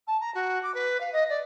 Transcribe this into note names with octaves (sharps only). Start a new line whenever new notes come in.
A5
A#5
F#4
D6
B4
F5
D#5
D5